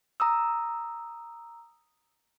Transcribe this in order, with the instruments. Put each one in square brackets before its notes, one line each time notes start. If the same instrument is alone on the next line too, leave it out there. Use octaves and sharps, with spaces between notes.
[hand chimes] A#5 D#6 E6